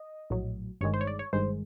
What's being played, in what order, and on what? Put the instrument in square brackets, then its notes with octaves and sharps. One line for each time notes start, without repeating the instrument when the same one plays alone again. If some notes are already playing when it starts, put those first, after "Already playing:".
Already playing: [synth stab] D#5
A#1 A2 F#3
G1 G2 D#3 G#3 C#5
C5
C#5
D5
C#5
G1 G2 D#3 G#3 C5